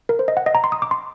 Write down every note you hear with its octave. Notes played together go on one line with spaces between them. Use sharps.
A#4
C5
D#5
F#5
D#5
A#5
C6
D#6
D6
C6